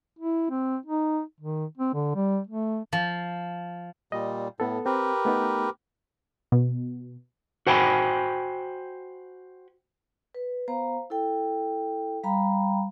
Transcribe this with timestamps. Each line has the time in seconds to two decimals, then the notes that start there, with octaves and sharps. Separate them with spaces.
0.19 E4
0.50 C4
0.86 D#4
1.41 D#3
1.78 C4
1.94 D3
2.15 G3
2.47 A3
2.93 F3
4.12 A#2 G3 D#5
4.60 A2 B3 A4
4.86 C4 G4 A#4 B4
5.25 A3 B3 D#4
6.52 B2
7.67 F#4 C5 G5 G#5 B5
10.35 B4
10.68 B3 C5 F5 A#5
11.10 E4 A4 G5
12.23 G3 F5 G5 A#5 B5